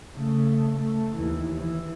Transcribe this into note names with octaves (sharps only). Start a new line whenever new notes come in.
C#3 A3
A3
D#2 E3
E3